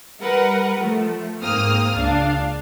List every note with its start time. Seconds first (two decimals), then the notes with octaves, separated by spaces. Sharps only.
0.21 G3 A#4 B4 F#5
0.81 F3 A3
1.42 G#2 A#3 C4 D#6 F6
1.93 C#2 D4 F5